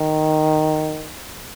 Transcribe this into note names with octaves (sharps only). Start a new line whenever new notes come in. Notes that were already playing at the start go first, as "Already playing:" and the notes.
Already playing: D#3